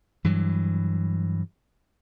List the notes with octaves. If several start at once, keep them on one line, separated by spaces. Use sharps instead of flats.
G2 E3 F#3